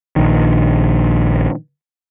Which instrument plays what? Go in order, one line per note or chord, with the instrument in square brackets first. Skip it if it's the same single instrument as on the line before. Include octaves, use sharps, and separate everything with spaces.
[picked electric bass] A#1 D#3